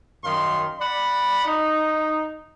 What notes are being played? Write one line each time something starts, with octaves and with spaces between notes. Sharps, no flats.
F#2 D#3 F5 C6
D5 F#5 B5
D#4